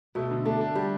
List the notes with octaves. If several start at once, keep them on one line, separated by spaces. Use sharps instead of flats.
B2 A3
D3
A3 D4
D4
G3